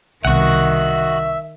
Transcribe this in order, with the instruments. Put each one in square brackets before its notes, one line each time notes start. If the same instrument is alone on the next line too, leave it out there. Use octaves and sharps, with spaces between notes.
[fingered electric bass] C2 B2 [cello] D#3 [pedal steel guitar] F#4 F#5 [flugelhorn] E5